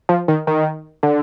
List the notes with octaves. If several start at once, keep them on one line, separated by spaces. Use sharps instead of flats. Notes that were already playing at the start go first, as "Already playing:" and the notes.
F3
D#3
D#3
D3